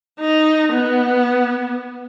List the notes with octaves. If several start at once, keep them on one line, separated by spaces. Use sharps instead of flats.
D#4
B3